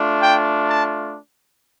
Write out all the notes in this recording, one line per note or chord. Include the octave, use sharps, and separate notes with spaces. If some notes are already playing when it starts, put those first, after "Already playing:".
Already playing: A3 D4 F4
G5
A5